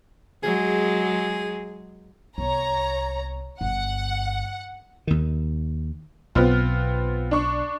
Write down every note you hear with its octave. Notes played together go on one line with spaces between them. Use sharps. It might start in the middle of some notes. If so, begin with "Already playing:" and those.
F#3 G#3 G#4
C2 B3 C#5 A#5
G1 F#5
D#2 D#3
B1 B3 C4 F4
D4 C#6